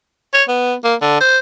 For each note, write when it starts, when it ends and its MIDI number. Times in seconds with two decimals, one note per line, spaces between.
0.34 0.44 73
0.48 0.75 59
0.84 0.95 58
1.01 1.17 50
1.21 1.38 72